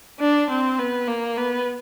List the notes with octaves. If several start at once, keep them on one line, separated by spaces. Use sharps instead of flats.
D4
C4
B3
A#3
B3